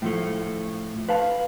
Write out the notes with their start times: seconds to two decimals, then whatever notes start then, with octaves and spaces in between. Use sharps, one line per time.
0.02 A2 F3 A3
1.09 B4 F5 A5